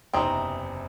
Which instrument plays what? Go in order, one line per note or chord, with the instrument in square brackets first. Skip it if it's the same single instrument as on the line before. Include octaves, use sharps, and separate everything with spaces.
[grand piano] F#1 E2 C3 [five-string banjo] C4 D#4